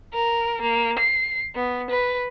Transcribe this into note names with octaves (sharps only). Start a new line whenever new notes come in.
A#4
A#3
C7
B3
B4